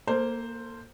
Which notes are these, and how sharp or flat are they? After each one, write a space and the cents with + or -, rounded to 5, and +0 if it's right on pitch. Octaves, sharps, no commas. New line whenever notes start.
A#3 +0 A4 +30 C5 +0